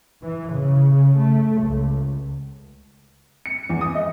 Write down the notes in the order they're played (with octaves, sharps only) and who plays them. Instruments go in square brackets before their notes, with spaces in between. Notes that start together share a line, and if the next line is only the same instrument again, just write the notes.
[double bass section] E3
C#3
A3
C#2
[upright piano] C#7
E2
D#6
D#5